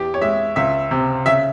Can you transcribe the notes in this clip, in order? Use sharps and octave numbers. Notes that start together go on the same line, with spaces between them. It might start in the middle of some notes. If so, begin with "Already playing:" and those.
Already playing: E2 G4
C#5
G#3 E5
C#2 E5
C3
C#3 E5